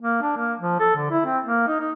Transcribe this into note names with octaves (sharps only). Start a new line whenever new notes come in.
A#3
D4
A#3
F3
A4
D3
E4
C4
A#3
D#4
D#4